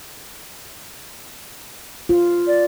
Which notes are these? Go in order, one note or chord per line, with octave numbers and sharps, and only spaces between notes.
F4
D5